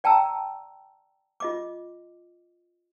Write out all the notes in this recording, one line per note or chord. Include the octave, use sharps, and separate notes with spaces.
D5 G5 A5 A#5 E6
F4 D#5 D6